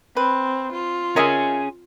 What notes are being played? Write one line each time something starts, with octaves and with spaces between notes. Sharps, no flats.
C4 B4
F4
C#4 G#4 A#4 D#5 E5